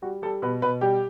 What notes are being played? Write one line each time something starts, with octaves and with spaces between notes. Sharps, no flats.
G3 F#4
G3 A4
B2 B4
B2 B4
G3 G4